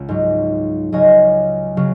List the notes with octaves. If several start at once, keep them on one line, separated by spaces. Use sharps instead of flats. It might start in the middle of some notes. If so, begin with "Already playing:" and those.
Already playing: C#2 C#3 C#5 F#5
G#2 F#3
C#2 C#3 F#3 D#5 G#5
C#3 F#3